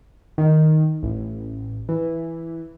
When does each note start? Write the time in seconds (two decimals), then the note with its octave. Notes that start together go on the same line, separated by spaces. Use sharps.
0.38 D#3
1.03 A1
1.89 E3